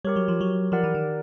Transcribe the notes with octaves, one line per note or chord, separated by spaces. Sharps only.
G3 G4 A#4 C#5
F#3
F3
F#3
F3 G4 A#4 D5 F#5
E3
D#3